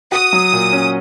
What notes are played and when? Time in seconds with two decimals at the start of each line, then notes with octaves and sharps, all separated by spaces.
0.12 F#4 D#6
0.33 F#3
0.53 A#2
0.73 C#4